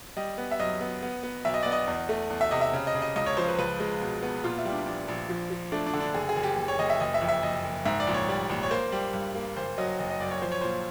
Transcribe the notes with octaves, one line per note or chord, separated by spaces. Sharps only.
G3 D#5
B3
E5
F#2 D#5
B3
B3
B3
B1 E5
D#5
B3 D5
D#5
E2
A3
E2
E5
C3 D#5
E5
C#3
D#5
C#3
D#5
C#2 D#5
C#5
F3 C5
B4
C#2 B4
G#3
B2
B3
A#2 F4
E4
G3
D4
A#1 D4
A#1
F3
F3
A3 D4
D4
D3
D4
F#1 G#4
G#4
F#1
G4
F#1
C#5
F#1 D#5
E5
F#1 D#5
E5
F2
E5
F#1 D#5
F#1
G#2 E5
D5
A#1
C#5
G3
A#1
C#5
A#3 C5
G3
G2
A#3
F#1 C5
F#3 D#5
F#1 D#5
D#5
F#2 D5
C#5
F3 C5
C#5
A#2 C5